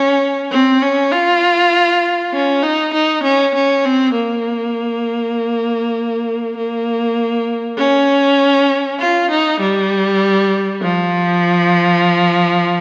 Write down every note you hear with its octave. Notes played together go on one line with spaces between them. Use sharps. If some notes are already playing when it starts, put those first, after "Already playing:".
Already playing: C#4
C4
C#4
F4
C#4
D#4
D#4
C#4
C#4
C4
A#3
A#3
C#4
F4
D#4
G3
F3